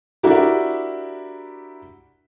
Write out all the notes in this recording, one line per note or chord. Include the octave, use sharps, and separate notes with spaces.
D4 E4 F#4 G4 A#4